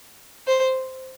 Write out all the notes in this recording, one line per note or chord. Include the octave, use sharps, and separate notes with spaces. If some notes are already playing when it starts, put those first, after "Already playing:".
C5